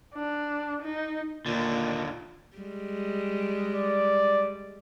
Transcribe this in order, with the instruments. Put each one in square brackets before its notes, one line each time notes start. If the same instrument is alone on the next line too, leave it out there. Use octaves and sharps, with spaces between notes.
[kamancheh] D4
D#4
[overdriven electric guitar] D#2 D3 [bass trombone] A#2
[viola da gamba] G3 G#3
[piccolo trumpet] D5